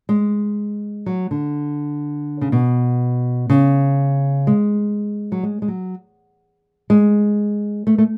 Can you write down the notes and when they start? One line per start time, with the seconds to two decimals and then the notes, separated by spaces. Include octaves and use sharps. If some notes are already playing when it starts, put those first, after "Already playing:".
0.09 G#3
1.06 F#3
1.31 D3
2.41 C#3
2.52 B2
3.50 C#3
4.47 G#3
5.32 F#3
5.43 G#3
5.62 G#3
5.68 F#3
6.90 G#3
7.87 A3
7.98 A3